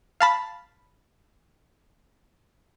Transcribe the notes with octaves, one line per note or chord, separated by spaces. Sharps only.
F5 A5 B5